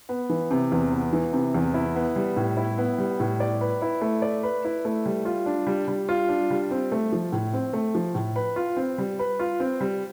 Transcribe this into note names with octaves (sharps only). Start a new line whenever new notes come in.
B3
E3
C3
E2
B3
E3
C3
E2
E4
B3
G3
A2
E4
B3
G3
A2
D5
B4
E4
A3
D5
B4
E4
A3
G3
F4
D4
G3
G3
F4
D4
G3
C4
A3
F3
A2
C4
A3
F3
A2
B4
F4
C4
G3
B4
F4
C4
G3